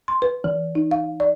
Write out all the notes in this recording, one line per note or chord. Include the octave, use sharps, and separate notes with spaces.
C6
B4
E3
D#4
F5
D5